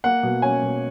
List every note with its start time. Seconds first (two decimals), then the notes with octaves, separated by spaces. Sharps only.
0.04 A#3 F#5
0.23 B2
0.42 C#4 G#5
0.62 B2